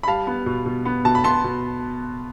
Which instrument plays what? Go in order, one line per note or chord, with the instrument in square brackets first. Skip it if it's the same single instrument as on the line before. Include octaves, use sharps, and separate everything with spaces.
[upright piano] B5
G3 F5 A5
B3
B2
B2
B3
B2 A5
B5
B3 A5 C6
B2